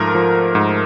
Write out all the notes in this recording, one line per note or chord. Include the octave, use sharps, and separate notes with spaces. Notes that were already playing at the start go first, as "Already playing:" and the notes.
Already playing: G#2 F3 A3 A#4
F3
G#2